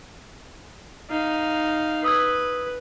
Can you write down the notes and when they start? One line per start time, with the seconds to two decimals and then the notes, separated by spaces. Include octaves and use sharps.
1.10 D#4 F5
2.04 B4 D#6 E6 G#6